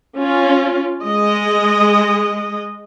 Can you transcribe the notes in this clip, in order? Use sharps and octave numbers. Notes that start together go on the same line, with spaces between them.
C#4 F4
G#3 D#5